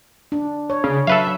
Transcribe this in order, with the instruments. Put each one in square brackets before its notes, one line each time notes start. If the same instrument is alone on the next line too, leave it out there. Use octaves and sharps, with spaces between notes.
[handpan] D4
C#5
[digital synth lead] C#3
[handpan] F#3 [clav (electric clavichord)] A4 B4 F5 [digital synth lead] E5